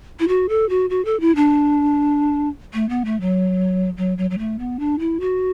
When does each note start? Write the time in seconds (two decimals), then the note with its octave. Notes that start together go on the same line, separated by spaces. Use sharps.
0.20 E4
0.28 F#4
0.49 A4
0.69 F#4
0.90 F#4
1.05 A4
1.20 E4
1.36 D4
2.74 A3
2.89 B3
3.05 A3
3.21 F#3
3.97 F#3
4.18 F#3
4.31 F#3
4.38 A3
4.59 B3
4.79 D4
4.99 E4
5.20 F#4